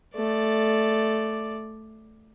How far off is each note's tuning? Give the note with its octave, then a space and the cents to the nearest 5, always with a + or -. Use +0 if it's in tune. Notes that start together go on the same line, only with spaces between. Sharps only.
A3 +0 D5 +5